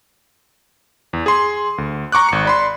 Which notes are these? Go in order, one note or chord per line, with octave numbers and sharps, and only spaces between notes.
E2
G#4 C6
D2
A#5 C#6 D6 F#6
G#1 C#7
D5 B5 C6